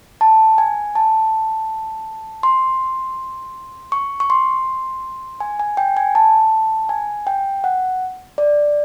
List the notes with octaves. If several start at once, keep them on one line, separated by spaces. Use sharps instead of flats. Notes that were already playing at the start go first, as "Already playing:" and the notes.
A5
G#5
A5
C6
C#6
C#6
C6
G#5
G#5
G5
G#5
A5
G#5
G5
F#5
D5